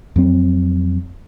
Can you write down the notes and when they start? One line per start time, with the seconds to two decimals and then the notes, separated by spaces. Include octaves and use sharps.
0.16 F2 F#3 C4